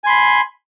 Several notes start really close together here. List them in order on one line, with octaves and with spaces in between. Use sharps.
G#5 C6 B5